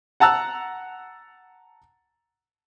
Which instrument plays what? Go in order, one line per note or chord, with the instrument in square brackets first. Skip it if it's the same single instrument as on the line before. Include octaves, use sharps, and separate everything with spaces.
[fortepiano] F#5 A5 A#5 E6 F#6